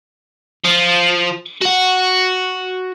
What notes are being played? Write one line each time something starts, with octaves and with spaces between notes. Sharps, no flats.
F3
F#4 F#5